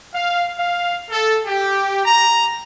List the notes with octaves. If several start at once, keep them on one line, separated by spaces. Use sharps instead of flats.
F5
F5
A4
G4
A#5